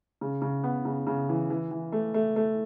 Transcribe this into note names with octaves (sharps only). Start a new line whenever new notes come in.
C#3
C#3
B3
C#3
C#3
E3
E3
E3
A3
A3
A3